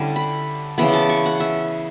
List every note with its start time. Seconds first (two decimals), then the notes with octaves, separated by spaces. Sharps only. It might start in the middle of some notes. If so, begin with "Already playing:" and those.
Already playing: D3 G3 C#4 E4
0.16 B5
0.78 C#3 E3 B3 B5
0.93 A5
1.09 C#6
1.26 F#5
1.40 E5